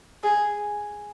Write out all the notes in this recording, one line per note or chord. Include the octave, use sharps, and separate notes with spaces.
G#4